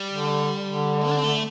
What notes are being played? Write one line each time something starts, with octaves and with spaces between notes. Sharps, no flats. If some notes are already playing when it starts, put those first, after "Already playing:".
Already playing: G3
D3
D3
D4
C4
A3